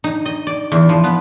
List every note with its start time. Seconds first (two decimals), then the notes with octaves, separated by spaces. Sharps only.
0.04 D#4
0.26 D#5
0.47 D5
0.72 E2
0.89 F3
1.04 B3